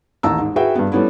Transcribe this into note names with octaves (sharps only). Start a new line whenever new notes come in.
A1 D#2 A5 A#5 E6
G#2
F#4 G#4 B4 E5 G5
G2 B3
G3 A3 B3 C#4 E4